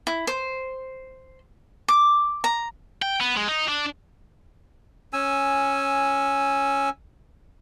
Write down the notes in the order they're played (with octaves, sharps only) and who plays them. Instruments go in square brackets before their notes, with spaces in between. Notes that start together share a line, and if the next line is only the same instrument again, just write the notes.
[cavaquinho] E4
C5
D6
A#5
[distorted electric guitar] G5
B3
G#3
D#4
D4
[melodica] C#4 G#5 E6